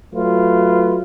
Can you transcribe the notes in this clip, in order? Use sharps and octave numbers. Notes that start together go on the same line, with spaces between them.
F#3 A3 F4 B4